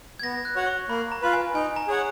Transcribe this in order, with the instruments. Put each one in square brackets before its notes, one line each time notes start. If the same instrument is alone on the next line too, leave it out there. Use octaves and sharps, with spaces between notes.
[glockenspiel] G#6
[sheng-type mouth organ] B3 [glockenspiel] A#6
[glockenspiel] F#6
[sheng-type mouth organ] F#4 C#5 F#5
[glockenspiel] C#6
[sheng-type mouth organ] A#3 [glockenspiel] B5
[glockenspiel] A#5
[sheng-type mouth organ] F4 B4
[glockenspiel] G#5
[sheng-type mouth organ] D#4 [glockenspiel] G#5
[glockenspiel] A#5
[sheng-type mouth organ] G#4 C#5 F#5